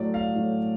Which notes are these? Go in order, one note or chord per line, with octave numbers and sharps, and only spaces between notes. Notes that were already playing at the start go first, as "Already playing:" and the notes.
Already playing: A2 F#3 A3 D5
F5
A2 F#3 A3